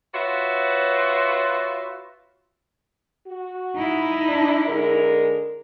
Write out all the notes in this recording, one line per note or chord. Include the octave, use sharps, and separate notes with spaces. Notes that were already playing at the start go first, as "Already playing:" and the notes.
F4 F#4 B4 C#5 E5
F#4
D#4 E4
D4
D3 G#3 A#4